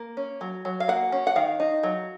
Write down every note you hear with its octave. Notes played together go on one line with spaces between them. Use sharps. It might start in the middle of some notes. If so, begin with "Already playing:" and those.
Already playing: A#3
C#4
F#3
F#3
F5
A#3 F#5
C#4
F#5
D#3 F5
D#4
F#3